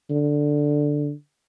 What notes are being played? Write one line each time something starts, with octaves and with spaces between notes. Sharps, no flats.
D3